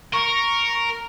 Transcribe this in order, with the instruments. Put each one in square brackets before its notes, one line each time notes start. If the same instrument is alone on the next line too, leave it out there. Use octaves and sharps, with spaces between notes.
[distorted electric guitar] A#4 [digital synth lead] C#6